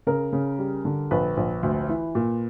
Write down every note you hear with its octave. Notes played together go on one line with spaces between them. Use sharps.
C#3 A#4
C#3
G3
D3
A#1 B4
A#1
D2
E3
A#2